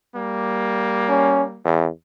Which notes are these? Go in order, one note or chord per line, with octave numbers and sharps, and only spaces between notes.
G3 A#3
C#4
E2